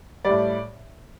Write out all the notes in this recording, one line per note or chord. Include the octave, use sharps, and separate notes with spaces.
A2 G3 D5